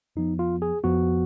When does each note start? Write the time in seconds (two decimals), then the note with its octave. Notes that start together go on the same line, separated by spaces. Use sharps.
0.16 F2 F3 B3 D#4
0.39 F4
0.62 G#4
0.83 F2 F3 B3 F#4